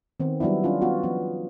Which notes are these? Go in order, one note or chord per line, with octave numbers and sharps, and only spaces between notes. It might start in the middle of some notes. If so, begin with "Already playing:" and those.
D#3 B3 C4
F#3 G3 B3 D4 E4
C#4 D4 F4
B3 F4 F#4
F3 B3